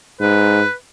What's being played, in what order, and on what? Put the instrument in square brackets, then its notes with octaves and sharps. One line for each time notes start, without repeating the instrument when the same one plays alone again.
[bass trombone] G#2 [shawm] B4